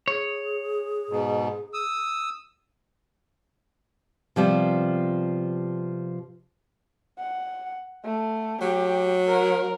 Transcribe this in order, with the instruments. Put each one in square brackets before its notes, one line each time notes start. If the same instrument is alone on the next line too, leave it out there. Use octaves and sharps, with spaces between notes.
[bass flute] G#4 [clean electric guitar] C#5
[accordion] G#2 B2
D#6 E6
[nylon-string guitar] C3 F3 G3 B3
[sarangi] F#5
A3
[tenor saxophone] F#3 [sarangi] G4
[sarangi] A#4